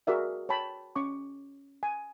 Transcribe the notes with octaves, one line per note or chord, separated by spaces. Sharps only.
F#4 G#4 A#4 D5 E5 F#5
C#5 G5 A5 B5
C#4 C#6 D6
G#5